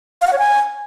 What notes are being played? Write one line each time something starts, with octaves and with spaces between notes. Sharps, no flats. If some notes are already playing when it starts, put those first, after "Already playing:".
F5
F#5
C#5
G#5